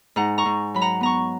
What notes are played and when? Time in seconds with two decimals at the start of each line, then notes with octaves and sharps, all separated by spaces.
0.16 G#2 F#5 A#5
0.38 A#5 C#6
0.45 G#2
0.74 F#3 B5
0.82 F#5 A#5
1.01 B3 A#5 C#6